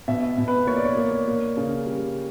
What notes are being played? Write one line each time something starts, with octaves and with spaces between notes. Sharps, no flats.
B2 E5
B2
B4
A#3 C#5
D5
C#5
A#3
A#3
C#3
G3